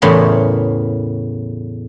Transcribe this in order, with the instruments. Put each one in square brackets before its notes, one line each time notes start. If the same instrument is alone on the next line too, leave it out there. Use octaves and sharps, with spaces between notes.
[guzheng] E2 A2 C#3 A#4 B5 C6